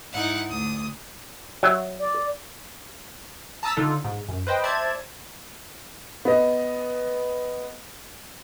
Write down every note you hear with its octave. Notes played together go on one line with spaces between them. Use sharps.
G#2 D#4 E4 F#5
D2 D#6
F#3 E5
D5
A5 A#5 D#6 E6 A6 B6
D3 D4 D#4 F4 A4
G#2
F#2
B4 C5 D#5 G5
C5 D5 E5 A5 G#6
B3 D#5